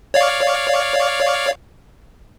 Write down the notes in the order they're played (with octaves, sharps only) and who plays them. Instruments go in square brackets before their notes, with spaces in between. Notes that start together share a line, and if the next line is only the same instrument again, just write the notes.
[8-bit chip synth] C#5 D5 F5